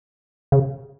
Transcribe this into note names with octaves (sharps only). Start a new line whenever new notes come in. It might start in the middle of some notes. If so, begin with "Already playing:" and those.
C#3